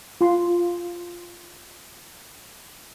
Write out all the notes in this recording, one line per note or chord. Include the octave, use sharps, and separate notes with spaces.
F4 C6